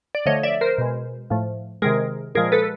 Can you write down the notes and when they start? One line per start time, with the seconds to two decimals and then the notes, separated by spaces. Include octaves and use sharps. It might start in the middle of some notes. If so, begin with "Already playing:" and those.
0.15 D5
0.26 D3 F3 A3 C#5 D#5
0.43 D5 E5
0.61 A#4 C5
0.78 B2 G#3
1.30 A2 F3 A3
1.82 C3 D#3 G#3 G#4 A#4
2.35 A#2 F3 G#3 G#4 A#4
2.52 A4 B4